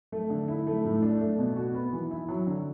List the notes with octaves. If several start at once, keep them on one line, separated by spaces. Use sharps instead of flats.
A3
D3
E4
A3
A2
D4
A3
B2
F#4
B3
E3
E4
F#3
D3